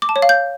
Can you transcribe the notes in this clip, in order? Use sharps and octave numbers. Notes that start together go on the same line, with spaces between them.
D6
A5
C#5
F5
G6